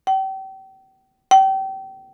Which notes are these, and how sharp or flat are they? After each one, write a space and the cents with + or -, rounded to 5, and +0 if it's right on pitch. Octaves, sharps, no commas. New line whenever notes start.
G5 -35
G5 -30